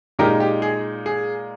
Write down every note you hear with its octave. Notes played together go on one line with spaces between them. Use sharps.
A#2 G#3 D#4 G4 A#4
G4
G#4
G#4